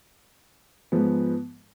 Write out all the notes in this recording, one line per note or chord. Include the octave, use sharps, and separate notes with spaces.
G#2 F3 G#3 B3